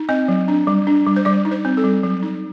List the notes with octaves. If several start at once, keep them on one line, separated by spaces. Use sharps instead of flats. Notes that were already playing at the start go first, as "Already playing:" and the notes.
Already playing: D#4
C4 D#5
F#3
D4
G3
D4
G3
C5
G3 D5
D#4
C5
C4
A4
G3
F#3
D#4